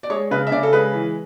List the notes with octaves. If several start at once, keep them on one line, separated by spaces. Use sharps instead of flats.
D5
G#3 C#5
C#3 B4
E5
C#3 D5
A4
G#3 B4
E3